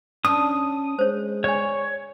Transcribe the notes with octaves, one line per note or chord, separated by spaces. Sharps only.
C#4 D4 D#6
G#3 C5 C#5
C#5 D5 G#5